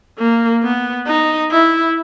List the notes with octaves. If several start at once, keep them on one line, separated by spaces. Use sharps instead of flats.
A#3
B3
D#4
E4